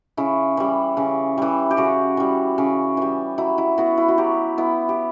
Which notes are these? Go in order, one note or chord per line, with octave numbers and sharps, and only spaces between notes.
C#3 E4
E3 G3
C#3
E3 G3
G4
C#3 F#4
E3 G3
C#3
E3 G3
F#3 E4
E4
B3 E4 F#4
E4
F#4
F#3 G4
B3 E4
G4